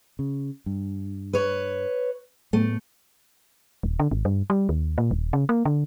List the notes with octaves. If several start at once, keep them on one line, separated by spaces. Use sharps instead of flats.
C#3
G2
B4 C#5
A2 A3 B3
D#1
D3
G#1
G2
G3
D#2
A#2
D#1
C#3
A#3
D3